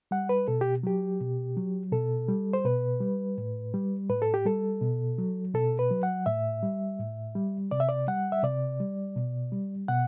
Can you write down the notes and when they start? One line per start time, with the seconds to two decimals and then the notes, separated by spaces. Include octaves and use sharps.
0.11 G3 F#5
0.29 B4
0.48 B2 A4
0.61 G4
0.83 F#3 G4
1.20 B2
1.57 F#3
1.92 B2 A4
2.28 G3
2.53 C5
2.65 B2 B4
3.01 G3
3.38 A2
3.74 G3
4.10 A2 B4
4.22 A4
4.34 G4
4.45 G3 A4
4.81 B2
5.18 F#3
5.54 B2 A4
5.79 B4
5.91 F#3
6.03 F#5
6.26 A2 E5
6.63 G3
6.99 A2
7.35 G3
7.71 C3 D5
7.80 E5
7.89 D5
8.08 G3 F#5
8.32 E5
8.43 C3 D5
8.80 G3
9.16 B2
9.52 G3
9.88 B2 F#5